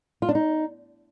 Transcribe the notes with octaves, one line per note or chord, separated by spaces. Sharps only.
F4
D4
D#4